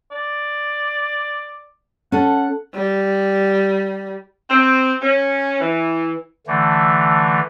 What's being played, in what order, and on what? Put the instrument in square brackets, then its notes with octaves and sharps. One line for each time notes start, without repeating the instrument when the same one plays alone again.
[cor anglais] D5
[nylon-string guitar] C#4 A4 [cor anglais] F#5
[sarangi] G3
[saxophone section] C4
C#4
E3
[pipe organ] D3 E3 A3